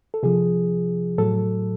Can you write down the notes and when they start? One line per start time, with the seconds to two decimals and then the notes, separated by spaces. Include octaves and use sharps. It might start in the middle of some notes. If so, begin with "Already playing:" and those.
0.14 A4
0.23 C3 F3 G#4
1.18 A2 F#3 A4